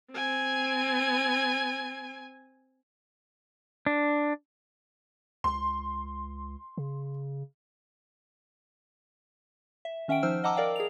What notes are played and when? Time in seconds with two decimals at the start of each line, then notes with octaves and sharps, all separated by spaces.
0.13 C4 G#5
3.87 D4
5.44 C#2 C6
6.78 C#3
9.85 E5
10.08 D#3 C#4 E5 F#5 G5 D7
10.23 F3 D#4 C5 E6 F6
10.44 D#5 F#5 A5 A#5 D6 E6
10.56 A#4 D5 F5 G5
10.76 G#4 F7